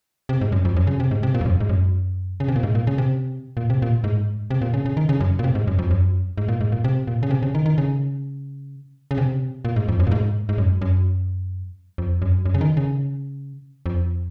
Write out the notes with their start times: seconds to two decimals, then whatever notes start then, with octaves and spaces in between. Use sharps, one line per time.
0.29 C3
0.41 G#2
0.52 F#2
0.65 F2
0.76 F#2
0.87 C#3
1.00 C3
1.11 G#2
1.23 C3
1.34 A#2
1.41 F2
1.46 F#2
1.60 G#2
1.69 F#2
2.40 C#3
2.48 C3
2.56 A#2
2.63 G#2
2.75 A#2
2.87 C#3
2.98 C3
3.57 A#2
3.70 C3
3.82 A#2
4.04 G#2
4.51 C3
4.62 A#2
4.74 C#3
4.86 C#3
4.97 D#3
5.09 C#3
5.20 F#2
5.39 A#2
5.44 C3
5.55 G#2
5.67 F#2
5.79 F2
5.91 F#2
6.38 G#2
6.48 A#2
6.61 G#2
6.72 A#2
6.84 C3
7.07 A#2
7.23 C#3
7.31 C3
7.43 C#3
7.55 D#3
7.66 D#3
7.78 C#3
9.11 C#3
9.18 C3
9.65 A#2
9.76 G#2
9.88 F2
10.00 F#2
10.07 A#2
10.11 G#2
10.49 G#2
10.58 F#2
10.82 F#2
11.98 F2
12.22 F#2
12.46 F#2
12.54 C#3
12.61 D#3
12.77 C#3
13.86 F2